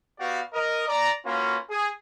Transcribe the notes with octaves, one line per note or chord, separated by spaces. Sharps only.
B3 F#4 G4 D5 F5
A#4 D#5
D5 A#5
A#3 C#4 F4 F#4 B4
G#4